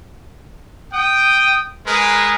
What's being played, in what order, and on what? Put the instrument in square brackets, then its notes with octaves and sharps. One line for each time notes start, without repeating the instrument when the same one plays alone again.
[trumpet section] G5 D#6
G#3 G#4 A#4 B4